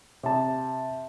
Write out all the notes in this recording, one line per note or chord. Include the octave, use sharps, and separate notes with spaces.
C3 A5